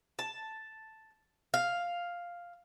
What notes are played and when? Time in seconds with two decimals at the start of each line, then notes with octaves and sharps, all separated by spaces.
0.19 A5
1.54 F5